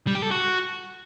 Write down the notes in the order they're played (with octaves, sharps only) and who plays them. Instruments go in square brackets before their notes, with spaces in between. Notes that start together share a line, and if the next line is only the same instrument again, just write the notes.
[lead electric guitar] G3
G4
A4
F#4